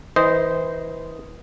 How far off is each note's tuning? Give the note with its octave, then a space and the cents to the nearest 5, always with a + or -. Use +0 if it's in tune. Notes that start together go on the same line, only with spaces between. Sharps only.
E3 -30 C5 -15 D#5 +0